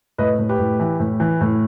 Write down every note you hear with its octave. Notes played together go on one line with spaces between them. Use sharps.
A2 B4 D#5
A2
G4 B4
A2
E3
A2
E3
A2